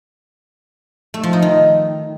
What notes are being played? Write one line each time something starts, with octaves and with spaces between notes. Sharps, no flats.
A3
F3
D#4
D#3